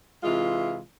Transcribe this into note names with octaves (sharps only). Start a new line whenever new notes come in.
C3 E3 G#3 F4